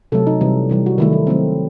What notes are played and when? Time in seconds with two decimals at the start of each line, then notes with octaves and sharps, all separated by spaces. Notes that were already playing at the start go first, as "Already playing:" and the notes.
0.12 C3 F#3 A3 A4
0.27 D#4
0.41 C3 E3 G3
0.70 C3 E3 G3
0.86 F#4
0.98 D#3 F#3 A3 E4
1.13 D#4
1.27 D#3 F#3 A3 C4